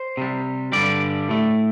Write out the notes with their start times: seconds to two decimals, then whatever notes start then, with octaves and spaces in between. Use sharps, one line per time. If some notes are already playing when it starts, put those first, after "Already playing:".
Already playing: C5
0.17 C3 G3
0.72 G2 D3 G3 D5
1.28 A2 A3